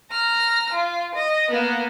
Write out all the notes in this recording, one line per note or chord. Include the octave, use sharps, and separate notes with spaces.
A#5 F6
F4
D#5
A#3 B3